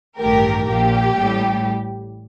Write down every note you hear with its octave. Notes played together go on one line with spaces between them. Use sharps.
A1 G2 D#3 A3 G4 A#4
A#1 A#2 F3 A#3 G4
A1 A2 G3